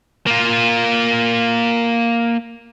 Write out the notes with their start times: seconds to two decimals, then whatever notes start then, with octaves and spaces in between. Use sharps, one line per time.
0.27 A#3 F4